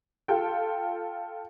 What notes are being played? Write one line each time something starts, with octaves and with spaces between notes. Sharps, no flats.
F4 A4 G5